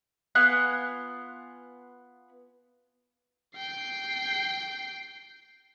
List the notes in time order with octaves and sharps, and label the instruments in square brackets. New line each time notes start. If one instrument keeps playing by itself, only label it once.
[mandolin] B3 F4 G#5 F#6
[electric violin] G5 C7